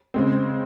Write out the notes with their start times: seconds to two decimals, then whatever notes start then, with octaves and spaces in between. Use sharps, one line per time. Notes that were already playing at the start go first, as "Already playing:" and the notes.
0.14 C#3 G#3 C4